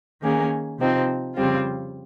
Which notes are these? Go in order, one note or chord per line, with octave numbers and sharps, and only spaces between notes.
D#3 A#3 C#4 G#4
C3 F3 C4 D#4
F2 C#3 G3 C4 F4